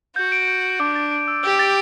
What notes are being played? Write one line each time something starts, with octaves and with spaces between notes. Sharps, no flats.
F#4 G6
D7
G6
D7
D4 D6
A6
D7
E6
G4 E6
A6